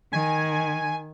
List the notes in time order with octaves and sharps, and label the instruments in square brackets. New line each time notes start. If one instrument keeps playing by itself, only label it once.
[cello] D#3 [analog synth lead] G#5